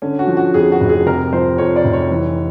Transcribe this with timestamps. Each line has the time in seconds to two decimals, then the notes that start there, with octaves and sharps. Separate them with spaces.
0.02 D3 C#4
0.19 F#4
0.27 F3
0.37 F#4
0.54 F2 G#4
0.72 F#4
0.80 F1
0.89 G#4
1.06 C3 A#4
1.33 F3 C5
1.58 F2 C#5
1.76 D5
1.84 F1
1.93 C#5
2.11 E3